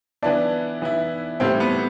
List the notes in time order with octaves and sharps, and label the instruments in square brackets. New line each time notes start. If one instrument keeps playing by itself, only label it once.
[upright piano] E3 B3 E4 [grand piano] D4
[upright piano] E3 B3 E4
[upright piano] A2 E3 G3 [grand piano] C4
[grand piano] B3